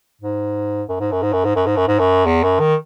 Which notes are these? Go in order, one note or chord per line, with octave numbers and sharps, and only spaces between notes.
G#2
F#2
G#2
F#2
G#2
F#2
G#2
F#2
G#2
F#2
G#2
F#2
E2
F#2
D#3